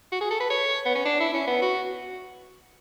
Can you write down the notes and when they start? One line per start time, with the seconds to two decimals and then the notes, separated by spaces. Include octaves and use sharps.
0.12 F#4
0.21 G#4
0.31 A4
0.40 B4
0.50 C#5
0.85 B3
0.95 C#4
1.05 D4
1.20 E4
1.34 C#4
1.47 B3
1.62 F#4